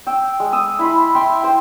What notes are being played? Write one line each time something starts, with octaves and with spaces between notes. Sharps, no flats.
G5 E6
G#3
D#6 E6
E4 B5 C6
E5 G5 C6
C5 G5